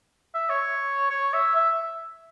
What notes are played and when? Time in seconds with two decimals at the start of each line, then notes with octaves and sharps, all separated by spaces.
0.34 E5
0.49 C#5
1.10 C#5
1.33 E5
1.56 E5